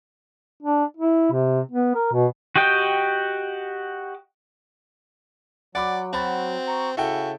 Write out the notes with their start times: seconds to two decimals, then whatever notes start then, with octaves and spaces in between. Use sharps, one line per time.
0.63 D4
0.97 E4
1.32 C3
1.71 B3
1.95 A#4
2.12 B2
2.56 F#4 G4 D#5 G5
5.75 F#3 D5 F#5 B5 D6
6.13 C4 F#4 B5 A6
6.68 A#5 C#6
6.97 C#3 E4 F#4 A4 G5